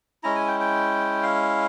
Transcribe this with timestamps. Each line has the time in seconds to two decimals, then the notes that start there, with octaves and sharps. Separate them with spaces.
0.23 G#3 C#4 E4 A#5
0.35 G#5
0.48 G5
0.60 G5
1.23 F5